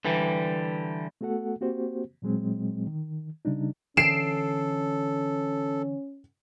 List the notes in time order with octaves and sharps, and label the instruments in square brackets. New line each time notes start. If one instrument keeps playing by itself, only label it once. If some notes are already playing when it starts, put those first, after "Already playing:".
[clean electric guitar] D3 E3 G3
[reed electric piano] A3 B3 F#4 A4 F#5
A#3 C4 F#4 G4 C5
A#2 F#3 G#3 C4
D#3
C#3 G3 D4 D#4
[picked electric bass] D3 E3 [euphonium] C#4 [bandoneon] A4 [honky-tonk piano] C7 D7 E7